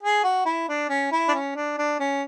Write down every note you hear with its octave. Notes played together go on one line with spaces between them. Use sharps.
G#4
F#4
E4
D4
C#4
E4
D4
C#4
D4
D4
C#4